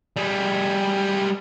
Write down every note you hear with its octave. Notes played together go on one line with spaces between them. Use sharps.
G3 G#4